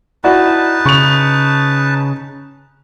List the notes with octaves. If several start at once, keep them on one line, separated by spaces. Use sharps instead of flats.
D#4 E4 F#4 B4 D5 A5
C#3 C#6 F7